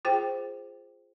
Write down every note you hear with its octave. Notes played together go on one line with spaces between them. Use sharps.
F4 G#4 C5 G5